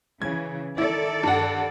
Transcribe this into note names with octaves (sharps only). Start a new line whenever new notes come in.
C#3 E3 G#6
D#3 E4 A4 D5
G2 F#5